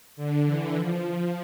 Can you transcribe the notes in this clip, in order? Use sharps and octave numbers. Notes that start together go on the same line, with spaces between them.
D3
E3
F3